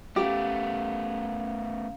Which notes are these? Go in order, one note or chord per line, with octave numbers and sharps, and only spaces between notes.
A3 B3 C#4 G4 F5 A#5